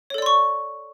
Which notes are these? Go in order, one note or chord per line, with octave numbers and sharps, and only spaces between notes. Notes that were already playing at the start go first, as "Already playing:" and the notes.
A4 C#5 D5 C6 C#6